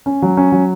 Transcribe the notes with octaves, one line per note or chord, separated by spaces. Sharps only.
C#4
F#3
C#4
F#3